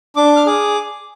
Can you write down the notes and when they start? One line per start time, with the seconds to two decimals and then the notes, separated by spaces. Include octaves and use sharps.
0.16 D4 D6
0.36 F6
0.46 G#4 D6